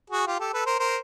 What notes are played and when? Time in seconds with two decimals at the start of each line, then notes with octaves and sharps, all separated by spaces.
0.10 F#4 G#4
0.27 F4 G4
0.40 G4 A4
0.53 A4 B4
0.66 A#4 C5
0.79 A#4 C5